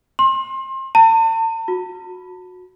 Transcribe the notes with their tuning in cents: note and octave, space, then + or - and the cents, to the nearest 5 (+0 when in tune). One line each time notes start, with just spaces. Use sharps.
C6 +30
A5 +40
F#4 -25